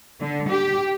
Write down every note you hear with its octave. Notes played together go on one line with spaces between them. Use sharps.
D3
G4